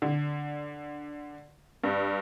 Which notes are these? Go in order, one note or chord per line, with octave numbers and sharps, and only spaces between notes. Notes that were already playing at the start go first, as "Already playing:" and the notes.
D3
G2